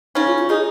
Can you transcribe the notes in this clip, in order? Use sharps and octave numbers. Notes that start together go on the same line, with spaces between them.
C#3 C#4 D#4
F4
F4
D#4 G#4